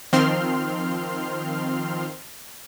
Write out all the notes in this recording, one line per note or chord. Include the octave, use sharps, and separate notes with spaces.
D#3 F3 C4 C6 F6